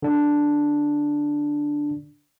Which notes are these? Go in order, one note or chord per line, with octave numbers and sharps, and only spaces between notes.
D3 D4